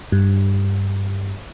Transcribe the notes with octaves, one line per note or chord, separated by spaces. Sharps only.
G2